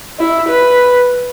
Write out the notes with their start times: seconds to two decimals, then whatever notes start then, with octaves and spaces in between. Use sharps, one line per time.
0.19 E4
0.49 B4